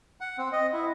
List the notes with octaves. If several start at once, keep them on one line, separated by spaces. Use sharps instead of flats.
F#5
C4
D#5
E4